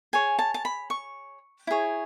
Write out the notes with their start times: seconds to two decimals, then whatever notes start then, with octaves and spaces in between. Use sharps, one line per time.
0.13 G#4 C#5 G#5
0.39 A5
0.54 A5
0.65 B5
0.90 C#6
1.67 E4 G#4 C#5